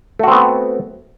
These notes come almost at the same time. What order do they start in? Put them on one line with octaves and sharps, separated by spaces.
A3 F#4 C4 B3